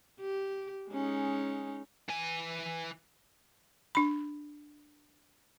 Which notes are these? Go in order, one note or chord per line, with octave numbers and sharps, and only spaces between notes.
G4
G#3 C#4 D#4
E3 G#5
D4 B5